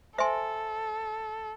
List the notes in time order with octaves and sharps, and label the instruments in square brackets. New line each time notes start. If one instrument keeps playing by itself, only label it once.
[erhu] A4 [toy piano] C5 E5 G#5 C6